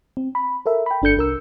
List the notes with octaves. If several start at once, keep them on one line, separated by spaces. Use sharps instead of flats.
C4
B5
A4 A#4 E5
G5 B5
G1 D4 A4 G6 C#7
C2 A#4 E6